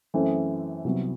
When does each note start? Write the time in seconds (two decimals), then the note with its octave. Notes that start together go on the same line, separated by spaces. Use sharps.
0.14 F#2 E3 A3 C4
0.84 C2 C3 F#3 B3 E4